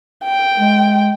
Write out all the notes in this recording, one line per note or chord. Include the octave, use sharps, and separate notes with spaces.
G5
G#3